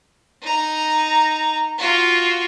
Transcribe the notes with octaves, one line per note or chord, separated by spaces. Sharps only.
D#4 A#5
F4 F#4